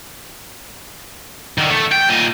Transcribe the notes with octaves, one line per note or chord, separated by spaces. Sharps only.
D3 D#3
A3
G5
A#2 D#5